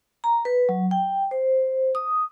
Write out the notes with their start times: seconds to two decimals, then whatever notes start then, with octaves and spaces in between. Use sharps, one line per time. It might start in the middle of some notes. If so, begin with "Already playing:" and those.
0.24 A#5
0.45 B4
0.69 F#3
0.91 G5
1.31 C5
1.95 D#6